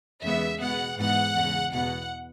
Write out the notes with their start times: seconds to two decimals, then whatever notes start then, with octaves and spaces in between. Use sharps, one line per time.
0.22 E2 C#3 G#3 B3 E5
0.59 B2 G#3 B3 F#5
0.97 G#2 E3 G#3 B3 F#5
1.35 E2 C#3 G#3
1.73 E2 B2 B3 F#5